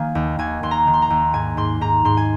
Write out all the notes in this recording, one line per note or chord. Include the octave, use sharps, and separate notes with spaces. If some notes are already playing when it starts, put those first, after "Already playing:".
Already playing: D#3 A#3 F5 G#5
D#2
D#2 G#5
D#2 C6
A#5
D#3
C6
A#5
D#2
G#2 G#5
G#2 C6
G#2 A#5
G#2 C6
G#5